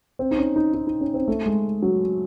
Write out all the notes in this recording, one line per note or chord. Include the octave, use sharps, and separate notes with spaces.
C4
D#4
C#4
D#4
D#4
D#4
C#4
C4
A3
G#3
F#3